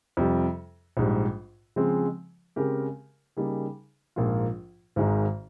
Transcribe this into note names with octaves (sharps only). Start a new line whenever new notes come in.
F2 C3 G3
A#1 G#2 G3
C#3 F3 G#3 C4
C#3 G#3 C4 G4 A#4
C#3 G3 A#3 D#4 G#4
A#1 G#2 F3 A#3 F4
G#1 G#2 D#3 G#3 D#4